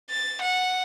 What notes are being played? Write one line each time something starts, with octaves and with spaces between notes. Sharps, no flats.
A6
F#5